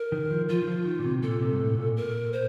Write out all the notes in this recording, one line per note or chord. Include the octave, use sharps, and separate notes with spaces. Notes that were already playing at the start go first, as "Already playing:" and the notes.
Already playing: A#4
D#3
F3
F3 F4
D#3
F3
D#3
A#2
C3
A#2 A4
C3
G2
A2
A#2
A#4
C5